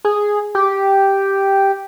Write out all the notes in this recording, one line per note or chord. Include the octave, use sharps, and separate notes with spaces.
G#4
G4